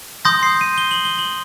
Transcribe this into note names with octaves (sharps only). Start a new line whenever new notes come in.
C6 D#6 G6 A#6
C7
D#7
G7
F#7
G7
F#7